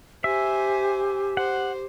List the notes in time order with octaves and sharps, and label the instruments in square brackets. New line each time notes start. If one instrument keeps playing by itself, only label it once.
[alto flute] G4 [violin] C5 G#5 [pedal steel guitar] E5
[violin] C5 [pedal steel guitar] F#5